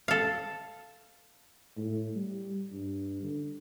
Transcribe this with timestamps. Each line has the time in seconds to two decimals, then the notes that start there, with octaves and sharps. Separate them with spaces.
0.08 A4 F5
1.77 A2
2.15 G3
2.72 G2
3.23 D3